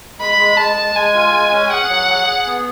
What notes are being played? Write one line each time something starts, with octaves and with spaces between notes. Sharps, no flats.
G#3 B5
G#3
G#3 A5
G#3
G#3 G#5
F4
G#3
C#4
G#4 F#5
F#3
G#4
G#4
B3